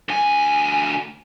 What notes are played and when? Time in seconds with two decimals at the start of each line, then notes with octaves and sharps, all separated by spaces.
0.09 D2 G#5